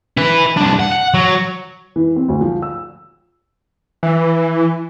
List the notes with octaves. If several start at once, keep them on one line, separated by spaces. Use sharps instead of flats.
E4 B4
C2 D4
F#5
F#5
F#3
E3
C4
D2
F3
E6
E3